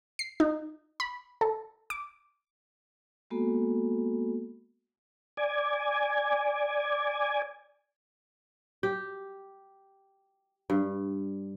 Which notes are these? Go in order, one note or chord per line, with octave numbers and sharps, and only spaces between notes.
C7
D#4
B5
A4
D6
G#3 A#3 B3 F#4 A4
D5 G#5
G4
G2